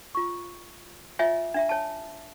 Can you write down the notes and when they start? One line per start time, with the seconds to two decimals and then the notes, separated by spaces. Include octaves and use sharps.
0.15 F4 C#6
1.19 F4 C#5 D#5 E5 G#5
1.54 D4 E5 A#5
1.69 C#5 G#5 A5